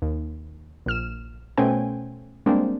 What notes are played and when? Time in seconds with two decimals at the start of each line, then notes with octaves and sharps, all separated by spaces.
0.02 D#2
0.86 A#1 F6 E7
1.57 B2 A3 C#4 C5 G5 G#5
2.46 G3 G#3 A#3 C4 D4